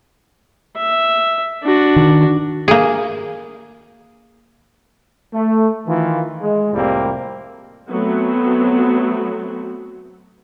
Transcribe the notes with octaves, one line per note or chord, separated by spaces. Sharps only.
E5
D4 F#4
D#3
A#3 G#4
A3
D#3 E3 F4
G#3
C2 F2 A2 G3 A#3 C4
F#3 A3 B3 C4 F#4